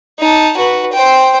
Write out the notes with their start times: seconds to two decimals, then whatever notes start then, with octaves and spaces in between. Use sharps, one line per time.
0.20 D#4 A5
0.57 F#4 B4
0.94 C5 G5